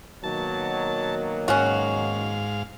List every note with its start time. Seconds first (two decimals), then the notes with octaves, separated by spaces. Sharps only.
0.24 B2 D#3 F#3 A#3 A5
1.48 G#2 C#4 F#4 F5